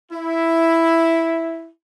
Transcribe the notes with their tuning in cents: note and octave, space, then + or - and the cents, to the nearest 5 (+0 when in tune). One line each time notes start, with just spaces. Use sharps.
E4 +0